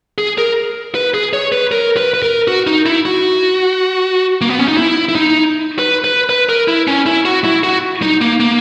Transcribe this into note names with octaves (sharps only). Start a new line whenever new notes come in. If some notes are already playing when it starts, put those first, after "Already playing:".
G#4
A#4
B4
G#4
C#5
B4
A#4
B4
B4
A#4
F#4
D#4
E4
F#4
A#3
B3
C#4
D#4
E4
E4
D#4
B4
B4
B4
A#4
E4
C#4
E4
F#4
E4
F#4
D#4
A#3
A#3